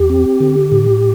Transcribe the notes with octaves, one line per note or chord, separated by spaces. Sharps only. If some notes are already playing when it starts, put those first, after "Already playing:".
Already playing: E2 G4
C4
D3
A2